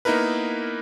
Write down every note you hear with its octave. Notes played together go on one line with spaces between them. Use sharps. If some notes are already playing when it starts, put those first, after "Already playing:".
A#3 B3 D#4 E4 A#4 B4